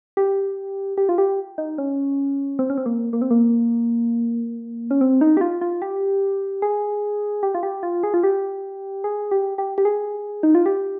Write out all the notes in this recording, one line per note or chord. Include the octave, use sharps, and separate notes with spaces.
G4
G4
F4
G4
D#4
C#4
C4
C#4
C4
A#3
A#3
C4
A#3
C#4
C4
D#4
G4
F4
F4
G4
G#4
G4
F4
G4
F4
G#4
F4
G4
G#4
G4
G4
G4
G#4
D#4
F4
G4